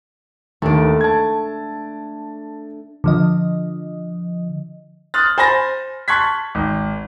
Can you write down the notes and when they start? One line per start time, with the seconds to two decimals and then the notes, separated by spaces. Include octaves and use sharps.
0.62 D#2 D#3 A3 D4
1.01 A5 G#6
3.04 D3 F3 D#5
5.14 C6 D#6 F6 F#6 A6
5.38 C5 G#5 B5 A6 A#6
6.08 A5 C6 C#6 F#6 G#6 B6
6.55 G#1